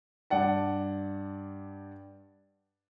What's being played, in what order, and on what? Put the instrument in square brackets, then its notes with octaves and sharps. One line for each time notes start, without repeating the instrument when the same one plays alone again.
[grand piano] G2 D5 F#5 A5